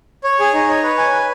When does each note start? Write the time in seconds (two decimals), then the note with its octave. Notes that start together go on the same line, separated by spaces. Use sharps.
0.24 C#5
0.40 G#4
0.54 D#4
0.69 C#5
0.83 B4
0.98 G#5
1.13 B4